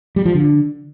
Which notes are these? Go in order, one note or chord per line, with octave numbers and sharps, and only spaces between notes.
G3
F3
D3